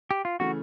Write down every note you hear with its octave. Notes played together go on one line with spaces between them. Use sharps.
G4
F4
C#3 E3 A3 F#4